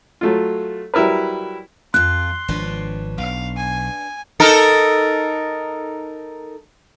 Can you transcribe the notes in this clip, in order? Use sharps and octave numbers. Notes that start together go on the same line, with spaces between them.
F#3 A3 F4
F#3 G3 E4 A#4 B4
F2 F4 C6 F#6
G#1 F3 D4 B4 C#5
B1 F5
G#5
D#4 A4 A#4